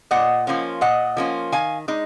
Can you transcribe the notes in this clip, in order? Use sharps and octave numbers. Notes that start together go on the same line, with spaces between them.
A#2 D#5 F#5
F3 A#3 C#4 F4
A#2 D#5 F#5
F3 A#3 C#4 F4
D#3 F5 G#5
G#3 D#4